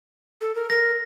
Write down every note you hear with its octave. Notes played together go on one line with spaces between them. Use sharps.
A4
A#4
A#4 A#6